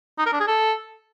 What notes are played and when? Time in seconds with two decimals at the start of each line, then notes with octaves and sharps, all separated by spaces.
0.18 D#4
0.26 A#4
0.33 D4
0.40 G#4
0.47 A4